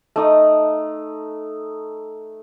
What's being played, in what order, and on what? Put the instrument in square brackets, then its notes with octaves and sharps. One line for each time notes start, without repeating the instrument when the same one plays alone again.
[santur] A3 D#4 D#6